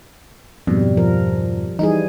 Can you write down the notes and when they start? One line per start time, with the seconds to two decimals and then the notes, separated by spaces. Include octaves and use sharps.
0.67 F2 G#2 B2 G3
0.97 F3 A#4
1.79 E3 G3 D#4 G#4